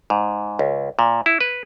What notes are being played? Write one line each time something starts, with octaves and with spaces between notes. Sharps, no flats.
G#2
C#2
A#2
E4
B4